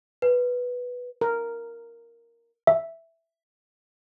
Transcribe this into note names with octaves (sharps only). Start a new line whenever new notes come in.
B4
A#4
E5